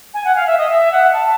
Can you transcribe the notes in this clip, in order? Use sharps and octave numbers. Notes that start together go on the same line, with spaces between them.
G#5
F#5
F5
E5
D#5
E5
F#5
A5